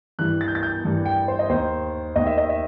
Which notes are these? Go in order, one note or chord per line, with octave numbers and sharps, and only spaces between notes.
G2 E3 F#6
A6
G6
A6
G6
G2 E3
G5
C5
D#5
D#2 D#3 C5
D#2 D#3 D#5
E5
D#5
E5